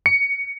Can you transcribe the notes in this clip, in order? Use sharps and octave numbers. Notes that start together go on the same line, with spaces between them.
C#7